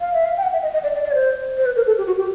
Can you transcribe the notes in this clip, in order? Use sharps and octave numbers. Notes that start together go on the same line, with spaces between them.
F5
E5
F5
G5
F#5
E5
D#5
D#5
D5
D5
D5
C#5
C5
C5
B4
A#4
A4
G4
F#4
G4